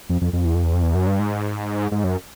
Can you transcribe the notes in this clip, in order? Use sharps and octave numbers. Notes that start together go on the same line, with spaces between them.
F2
F2
F2
E2
F2
E2
F2
E2
F#2
G2
G#2
G#2
F#2